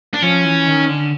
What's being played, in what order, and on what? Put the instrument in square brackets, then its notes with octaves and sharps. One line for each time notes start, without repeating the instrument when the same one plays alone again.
[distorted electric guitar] D4
[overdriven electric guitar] F3 [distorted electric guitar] C#4
[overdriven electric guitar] E3
D#3
D3